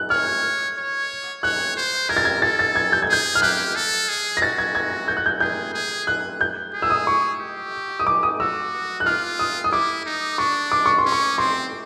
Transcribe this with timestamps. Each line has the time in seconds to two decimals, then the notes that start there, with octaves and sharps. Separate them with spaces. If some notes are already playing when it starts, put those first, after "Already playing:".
Already playing: F#6
0.10 C#5 F6
0.77 C#5
1.43 C#5 F#6
1.77 C5
2.09 A#4 G#6
2.17 A6
2.25 G#6
2.42 A4 A6
2.59 A6
2.75 G#6
2.92 G6
3.02 G#6
3.09 G#4 G6
3.35 F6
3.42 G4 F#6
3.75 A4
4.08 G#4
4.37 A#6
4.42 F#4 A6
4.58 G#6
4.75 G#6
5.08 G6
5.17 F#6
5.26 G6
5.40 G#4 G6
5.74 G#4
6.07 F#6
6.41 G6
6.74 G#4
6.82 E6
6.90 D#6
7.07 C#6
7.40 G4
8.00 D#6
8.07 D6
8.23 D#6
8.40 F#4 E6
9.00 F#6
9.05 F4 F6
9.39 D#6
9.64 D#6
9.72 E4 D6
10.06 D#4
10.38 D4 C#6
10.72 D6
10.86 C#6
10.98 C6
11.06 C#4
11.12 C#6
11.38 C4 C6